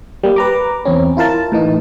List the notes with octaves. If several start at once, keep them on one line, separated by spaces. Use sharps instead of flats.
G3 A#3
B4 A#5 D6
E2 C4 C#4
E4 F4 A#4 A5
A2 E3 D#4